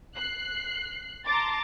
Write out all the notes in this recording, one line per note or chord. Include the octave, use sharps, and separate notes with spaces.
F#6 C7
A5 A#5 C6 D6 A6